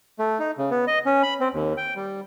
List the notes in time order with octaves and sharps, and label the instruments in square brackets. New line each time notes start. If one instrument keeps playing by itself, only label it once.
[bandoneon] A3
D#4
C#3
B3
D#5
C#4
B5
C4
D#2
G5
G3